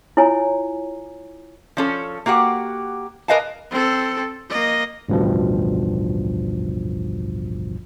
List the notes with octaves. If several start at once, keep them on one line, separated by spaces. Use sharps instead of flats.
E4 F4 C#5 G#5 A#5
F3 C#4 A4
A#3 F#4 G4 F#5
A#4 B4 D#5 F5 G#5 A5
C4 A4
A#3 D#5
A1 D2 G2 B2 F3